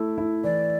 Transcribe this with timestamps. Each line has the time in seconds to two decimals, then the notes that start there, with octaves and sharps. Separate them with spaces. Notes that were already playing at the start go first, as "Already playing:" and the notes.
Already playing: A3 E4
0.18 E4
0.44 E3 D5